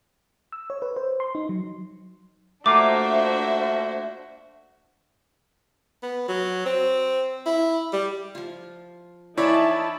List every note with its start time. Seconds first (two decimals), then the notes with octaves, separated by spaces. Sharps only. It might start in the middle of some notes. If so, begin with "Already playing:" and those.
0.52 E6
0.70 C#5
0.82 B4
0.96 C5
1.20 C6
1.35 D#4
1.49 F#3
2.66 A3 A#3 D4 F4 F#4 C5 E5 D6
6.03 B3
6.28 F#3
6.66 C4
7.46 E4
7.93 G3
8.35 F3 F4
9.38 E3 D#4 E4 C#5 D5 A5 B5